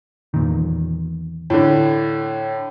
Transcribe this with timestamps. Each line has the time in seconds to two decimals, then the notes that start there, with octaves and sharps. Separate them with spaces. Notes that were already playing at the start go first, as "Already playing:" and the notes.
0.34 E2 A#2 D#3
1.50 A2 D3